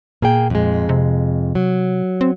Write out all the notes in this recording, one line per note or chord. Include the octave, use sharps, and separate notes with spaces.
A#2 A#3 G#4 G5
F2 G#3
C3
F#3
C4